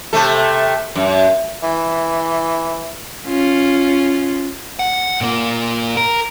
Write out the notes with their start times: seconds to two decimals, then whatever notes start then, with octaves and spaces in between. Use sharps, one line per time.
0.13 C3 A3 A4
0.96 F#2
1.63 E3
3.26 C#4 F4
4.79 F#5
5.21 A#2 A#3
5.97 A#4